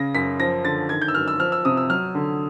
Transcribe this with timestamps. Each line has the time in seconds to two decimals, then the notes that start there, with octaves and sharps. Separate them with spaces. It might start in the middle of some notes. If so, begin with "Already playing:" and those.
Already playing: C#3 A#6
0.15 F#2 B6
0.40 F3 A#6
0.65 D3 A6
0.89 D#3 G#6
1.02 G6
1.08 E6
1.15 F#2 F6
1.28 E6
1.40 F3 F6
1.52 E6
1.65 C3 D#6
1.77 E6
1.90 F#3 F6
2.15 D3